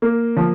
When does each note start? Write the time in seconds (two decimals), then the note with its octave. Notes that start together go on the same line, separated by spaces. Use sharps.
0.02 A#3
0.37 F3